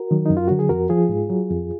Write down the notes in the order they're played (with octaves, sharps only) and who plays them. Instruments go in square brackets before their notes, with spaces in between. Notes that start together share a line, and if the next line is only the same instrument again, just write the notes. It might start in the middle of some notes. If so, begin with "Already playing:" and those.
Already playing: [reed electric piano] F#4 A#4
D#3 F#3
F#2 D#4
F4
D3 F#3 F#4
G#4
F2 F#4 A#4
F3 F4 G#4
G#2
F#3
F2